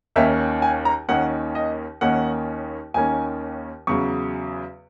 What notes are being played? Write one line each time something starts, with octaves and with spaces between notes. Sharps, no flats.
D#2 D#3 A#3 C#4 E5
G#5
A#5
D#2 D#3 A#3 C#4 F#5
D#5
D#2 D#3 A#3 C#4 F#5
D#2 D#3 A#3 C#4 G#5
E2 C#3 F#3 C#6